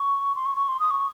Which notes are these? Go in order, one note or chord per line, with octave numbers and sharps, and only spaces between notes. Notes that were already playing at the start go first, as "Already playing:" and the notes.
Already playing: C#6
C6
C#6
C#6
C6
D#6
C#6